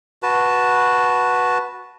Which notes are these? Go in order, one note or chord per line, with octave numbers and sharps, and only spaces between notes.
F#4 B4 A5